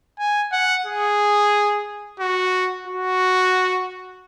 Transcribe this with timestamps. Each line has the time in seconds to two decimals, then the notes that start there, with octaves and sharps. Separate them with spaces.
0.19 G#5
0.52 F#5
0.86 G#4
2.20 F#4
2.88 F#4